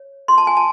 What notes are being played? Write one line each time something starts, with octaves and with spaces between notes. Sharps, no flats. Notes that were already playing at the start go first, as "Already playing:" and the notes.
Already playing: C#5
C6
A5
G#5
A5